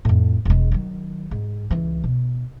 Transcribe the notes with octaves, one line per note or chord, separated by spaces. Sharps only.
F2 A2
E1 G#3
D#3 F#3
G#2
C#2 E3
B2